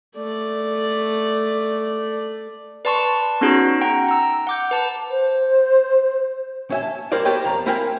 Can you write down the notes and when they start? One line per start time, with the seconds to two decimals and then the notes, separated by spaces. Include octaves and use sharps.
0.17 A3 D5
2.85 B4 D5 A5 C6 C#6
3.41 B3 C#4 D#4 F#4 G#4
3.81 F#5 G5 A#5
4.09 A#5 E6
4.47 F#5 D6 G6
4.71 B4 A5
5.11 C5
6.70 C#4 E5 G#5
6.82 A5
7.12 G3 E4 A#4 C5 D5
7.25 B3 G4 A4 C#5 D#5 G5
7.45 F2 A#5
7.66 C4 E4 A#4 F5 G5 G#5